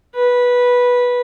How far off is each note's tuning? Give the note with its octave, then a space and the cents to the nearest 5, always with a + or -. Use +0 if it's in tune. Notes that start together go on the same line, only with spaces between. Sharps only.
B4 -10